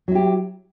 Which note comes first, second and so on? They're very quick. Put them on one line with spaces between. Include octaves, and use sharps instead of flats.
F#3 E4 G4